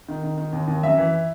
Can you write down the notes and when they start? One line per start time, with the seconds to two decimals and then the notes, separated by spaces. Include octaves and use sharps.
0.09 D#3
0.23 D#3
0.38 D#3
0.53 D#2
0.68 D#2
0.83 F#2 E5
0.98 E3